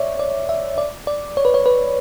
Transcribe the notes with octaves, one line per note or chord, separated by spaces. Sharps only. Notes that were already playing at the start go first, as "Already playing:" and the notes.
Already playing: C#5 D5 E5
D5
E5
D5
D5
C#5
B4
C#5
B4